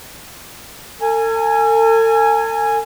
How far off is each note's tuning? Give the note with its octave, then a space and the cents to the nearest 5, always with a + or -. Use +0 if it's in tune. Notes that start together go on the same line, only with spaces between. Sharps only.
A4 +45 G#5 +0